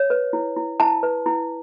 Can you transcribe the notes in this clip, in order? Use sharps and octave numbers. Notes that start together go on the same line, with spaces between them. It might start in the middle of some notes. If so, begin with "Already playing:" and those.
Already playing: C#5
B4
E4
E4
E4 A5
B4
E4